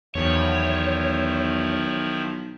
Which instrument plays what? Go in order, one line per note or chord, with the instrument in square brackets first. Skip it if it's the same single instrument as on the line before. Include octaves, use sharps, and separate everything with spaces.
[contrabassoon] B1 [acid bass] E2 [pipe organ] D#3 F3 E4 [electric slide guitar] C#5